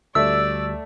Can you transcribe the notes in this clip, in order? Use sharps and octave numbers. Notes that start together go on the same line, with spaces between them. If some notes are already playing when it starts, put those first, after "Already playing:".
D2 G3 A3 D5 E5 E6